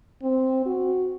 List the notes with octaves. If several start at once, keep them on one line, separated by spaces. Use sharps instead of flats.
C4
F#4